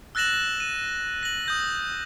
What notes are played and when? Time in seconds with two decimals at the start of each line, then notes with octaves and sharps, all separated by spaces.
0.15 E6 F#6 A6 A#6 E7 F#7
0.60 D#7
1.23 A#6 F#7
1.46 D#6 G6 A#6